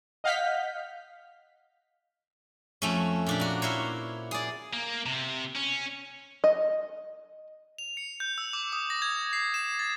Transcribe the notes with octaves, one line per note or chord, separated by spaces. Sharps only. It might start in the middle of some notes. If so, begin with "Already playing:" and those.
D#5 F5 F#5 F6 G6 B6
F2 A3 C#4
A#2 D4 G4
A#3 F#4
E4 A#4 C5 C#5
G#4 D5
A#3
C3
C#4
D#5
F7
C#7
G6
E6
D6
D#6
A#6
G#6
C7
E7
A6